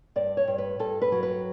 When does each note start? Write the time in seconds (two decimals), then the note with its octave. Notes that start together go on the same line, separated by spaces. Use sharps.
0.16 G2 D5
0.37 C#5
0.47 G2
0.58 B4
0.79 G2 A4
1.02 B4
1.12 F#3
1.23 B4